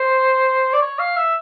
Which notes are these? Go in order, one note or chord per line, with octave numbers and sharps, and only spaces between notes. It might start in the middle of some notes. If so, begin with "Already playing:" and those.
Already playing: C5
D5
C#5
F5
E5